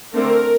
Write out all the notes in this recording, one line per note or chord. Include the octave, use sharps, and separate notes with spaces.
D3 A3 C4 A#4